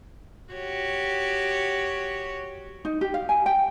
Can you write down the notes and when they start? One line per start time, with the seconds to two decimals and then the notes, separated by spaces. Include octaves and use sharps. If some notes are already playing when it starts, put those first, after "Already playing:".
0.53 F#4 G4 C#5
2.85 D#4
3.01 G4
3.14 F5
3.29 G#5
3.46 G5